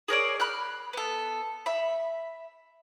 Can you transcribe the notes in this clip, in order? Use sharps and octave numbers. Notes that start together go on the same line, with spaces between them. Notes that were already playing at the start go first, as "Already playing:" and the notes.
G#4 A#4 C#5 D5
B5 F6 F#6
B3 A4
E5 B5